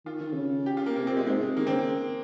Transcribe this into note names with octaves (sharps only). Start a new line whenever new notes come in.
D#3 F4
D#3
C3
C#3
G4
F4
A#3
C3 A#3
C4
C3 G#3
G#2 G#3
C3
D#3 A#3
C#3 C4